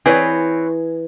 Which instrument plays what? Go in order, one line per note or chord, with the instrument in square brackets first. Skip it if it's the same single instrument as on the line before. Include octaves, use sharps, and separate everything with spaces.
[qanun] E3 [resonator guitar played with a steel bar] C4 B4 C#5 [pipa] G#4